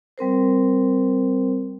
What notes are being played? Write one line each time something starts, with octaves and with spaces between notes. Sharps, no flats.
G3 C4 A#4 C5